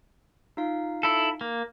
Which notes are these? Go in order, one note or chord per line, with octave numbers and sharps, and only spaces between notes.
D#4 F4 F5
E4 A4
A#3